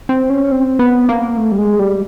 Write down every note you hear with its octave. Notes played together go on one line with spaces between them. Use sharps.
C4
C#4
C4
B3
A#3
A3
G3
G#3
G3